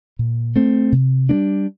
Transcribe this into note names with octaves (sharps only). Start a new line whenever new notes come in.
A#2
A3 C4
C3
G3 A#3 D4